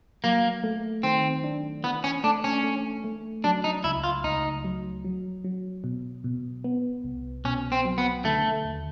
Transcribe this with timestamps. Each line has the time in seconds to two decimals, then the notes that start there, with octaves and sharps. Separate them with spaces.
0.24 F#3 A#3
0.64 A3
1.03 D#3 C4
1.44 D4
1.84 E3 B3
2.04 C#4
2.24 A3 D4
2.44 C#4
2.64 A3
3.04 A3
3.44 F#3 D4
3.64 D#4
3.84 C#2 E4
4.04 F4
4.24 C#2 D#4
4.64 F#3
5.04 F#3
5.44 F#3
5.84 B2
6.24 B2
6.64 B3
7.04 C2
7.44 B2 C#4
7.72 C4
7.85 F#3
7.98 B3
8.25 D3 A3
8.65 D#2